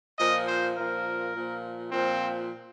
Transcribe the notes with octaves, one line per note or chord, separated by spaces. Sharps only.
A#2 F3 D#5
C5
A#2 F3 A#4
A#2 F3
A#2 F3 C4